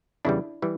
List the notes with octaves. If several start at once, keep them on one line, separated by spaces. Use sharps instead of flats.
E2 C#3 E3 G3 D4 E4
E3 G3